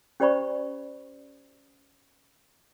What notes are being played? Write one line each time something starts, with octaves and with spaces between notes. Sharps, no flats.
C#4 G4 C5 D5 B5 C#6